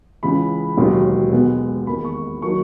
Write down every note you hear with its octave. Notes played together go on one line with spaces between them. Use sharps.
C#2 C#3 E3 B5
E1 D#2 D#3 F#3
B1 B2 G#3 B3
E2 D#3 A#3 B5
C#6
D#3 F#3 A#3 C#6